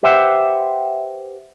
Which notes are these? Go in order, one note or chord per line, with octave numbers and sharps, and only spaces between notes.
G4 B4 C5 E5 F#5 G5